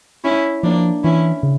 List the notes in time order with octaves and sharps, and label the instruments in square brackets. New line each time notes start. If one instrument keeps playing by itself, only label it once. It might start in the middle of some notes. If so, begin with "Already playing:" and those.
[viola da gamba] C#4 E4
[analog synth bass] F3 [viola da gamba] A#3 D4
[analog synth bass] E3 [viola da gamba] C#4 E4
[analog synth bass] C#3